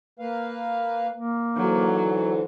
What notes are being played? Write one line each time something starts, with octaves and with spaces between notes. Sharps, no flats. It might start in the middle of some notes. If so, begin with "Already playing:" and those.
A#3 B4 F5
A#3
G#2 D3 E3 F#3